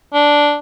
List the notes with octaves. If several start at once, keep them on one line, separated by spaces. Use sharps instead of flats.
D4